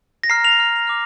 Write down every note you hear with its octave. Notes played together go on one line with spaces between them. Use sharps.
A#6
A#5 F6 C7
F7
A#5 F6
D6 F6